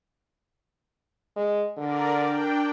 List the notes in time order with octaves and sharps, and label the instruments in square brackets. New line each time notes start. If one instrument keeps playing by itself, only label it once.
[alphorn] G#3
[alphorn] D3 [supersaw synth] A#4 D5
[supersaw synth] D4 G5